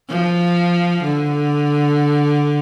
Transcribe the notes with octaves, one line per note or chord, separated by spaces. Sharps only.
F3
D3